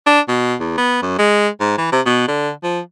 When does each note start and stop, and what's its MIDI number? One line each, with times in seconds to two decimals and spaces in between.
0.06 0.20 62
0.28 0.55 47
0.60 0.78 40
0.78 1.02 59
1.02 1.15 42
1.18 1.48 56
1.60 1.74 44
1.78 1.91 52
1.92 2.01 48
2.06 2.25 47
2.28 2.51 50
2.63 2.80 53